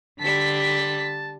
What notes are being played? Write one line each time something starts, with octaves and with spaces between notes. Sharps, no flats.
D3 G3 A5 B6